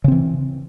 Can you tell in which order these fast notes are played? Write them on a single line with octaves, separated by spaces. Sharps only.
C#3 C4 E3